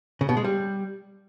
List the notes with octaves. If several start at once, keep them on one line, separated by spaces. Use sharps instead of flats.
C#3
B2
G#3
G3